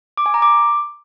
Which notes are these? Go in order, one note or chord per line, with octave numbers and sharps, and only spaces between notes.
D6
G#5
A#5
D6